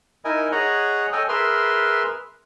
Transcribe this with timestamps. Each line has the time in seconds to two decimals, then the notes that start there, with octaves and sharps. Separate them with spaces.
0.25 D#4 E4 A#4 D#5 G#5
0.52 G#4 C#5 D#5 F#5 A#5
1.12 A4 C#5 D#5 G5 G#5
1.29 G#4 A#4 B4 E5 C6 F6